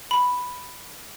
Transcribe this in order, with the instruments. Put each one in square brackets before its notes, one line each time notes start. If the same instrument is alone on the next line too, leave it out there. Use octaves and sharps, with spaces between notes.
[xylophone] B5